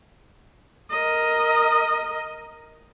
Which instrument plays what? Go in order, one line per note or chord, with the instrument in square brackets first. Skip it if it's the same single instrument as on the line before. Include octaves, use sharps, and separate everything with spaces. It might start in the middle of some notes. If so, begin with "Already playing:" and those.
[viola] A#4 D#5